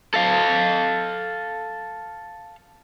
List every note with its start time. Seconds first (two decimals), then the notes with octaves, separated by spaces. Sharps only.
0.14 A4 F5